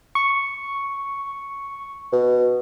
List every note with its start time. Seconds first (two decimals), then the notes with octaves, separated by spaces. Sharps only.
0.15 C#6
2.12 B2